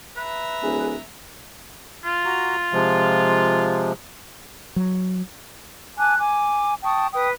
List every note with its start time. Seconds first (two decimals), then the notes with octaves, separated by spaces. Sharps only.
0.17 B4 E5 A#5
0.63 D1 G#4
2.04 F4
2.25 F#4 A#5
2.73 C3 F3 G#3
4.76 F#3
5.98 G#5 A5 D6 F#6
6.18 G#5 D6
6.84 G5 A5 C#6 D#6
7.13 B4 G5 D#6